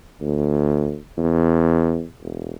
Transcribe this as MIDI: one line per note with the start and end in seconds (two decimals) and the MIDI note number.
0.22 0.97 38
1.18 2.04 40
2.23 2.54 28